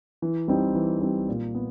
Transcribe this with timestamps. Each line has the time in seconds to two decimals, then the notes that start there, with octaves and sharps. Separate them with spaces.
0.22 E3
0.48 G3 C4 D#4
0.75 E3
1.01 G3 C4 D#4
1.29 A#2
1.55 B3